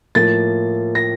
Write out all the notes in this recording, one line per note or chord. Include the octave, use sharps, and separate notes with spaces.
A2 F3 A#3 F4 A6
A#6